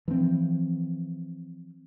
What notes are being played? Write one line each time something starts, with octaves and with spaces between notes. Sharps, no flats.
E3 F3 A3 C4